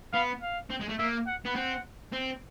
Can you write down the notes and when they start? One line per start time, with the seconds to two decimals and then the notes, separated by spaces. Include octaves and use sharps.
0.13 B3 F5
0.42 F5
0.70 C4
0.80 G#3
0.89 A3
0.99 A#3 E5
1.27 F#5
1.45 B3
1.55 C4 F#5
2.13 C4